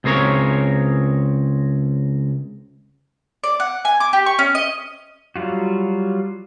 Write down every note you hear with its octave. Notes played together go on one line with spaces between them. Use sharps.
C#2 C4 G#4 A#4 C#5
D5
F#5
G#5
D6
G4
C#6
C#4
D#5
F#3 G3 F4 F#4